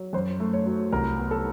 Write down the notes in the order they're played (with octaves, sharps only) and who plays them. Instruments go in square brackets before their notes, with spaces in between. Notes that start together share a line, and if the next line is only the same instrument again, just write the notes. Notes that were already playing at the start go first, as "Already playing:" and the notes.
Already playing: [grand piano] F#3
F#2 C5
A3
C#5
F#3
C2 A#4
B3
A4